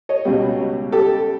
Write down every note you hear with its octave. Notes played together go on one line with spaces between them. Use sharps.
C#5 D#5
C#2 B2 G3
G4 A4